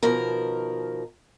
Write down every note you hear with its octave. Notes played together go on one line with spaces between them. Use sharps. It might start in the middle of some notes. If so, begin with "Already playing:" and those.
B2 D#3 F3 A#4